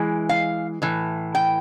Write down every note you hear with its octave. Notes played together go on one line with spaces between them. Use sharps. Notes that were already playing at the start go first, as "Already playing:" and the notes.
Already playing: E3 G#3
F5
A2 E3
G5